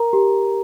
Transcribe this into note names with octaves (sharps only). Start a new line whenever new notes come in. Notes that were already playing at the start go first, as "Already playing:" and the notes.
Already playing: A#4 A#5
G4